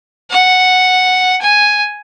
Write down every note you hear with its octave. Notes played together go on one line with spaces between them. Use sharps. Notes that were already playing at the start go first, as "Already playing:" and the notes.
F#5
G#5